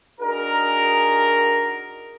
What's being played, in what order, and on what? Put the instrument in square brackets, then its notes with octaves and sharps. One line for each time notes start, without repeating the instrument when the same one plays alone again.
[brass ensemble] D4 D#4 F#4 G#4 A#4